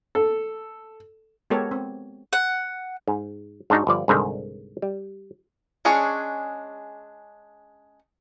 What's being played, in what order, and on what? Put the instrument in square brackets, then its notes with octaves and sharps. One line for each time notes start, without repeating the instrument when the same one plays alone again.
[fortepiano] A4
[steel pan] G#3 B3 G4 A4 A#4 C#5
C4
[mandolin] F#5
[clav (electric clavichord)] G#2
G#2 D4 D#4 F#4
G1 F3 D5
C2 G#2 D3 D#3
G3
[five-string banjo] G#3 C#4 D4 G#4 C#5